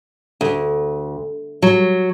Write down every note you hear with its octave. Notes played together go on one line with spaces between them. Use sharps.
D2
F#3